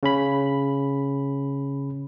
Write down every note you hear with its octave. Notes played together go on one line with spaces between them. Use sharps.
C#3 C#4 B5